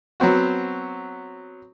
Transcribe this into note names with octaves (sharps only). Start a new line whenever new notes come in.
F#3 B3 C4 F#4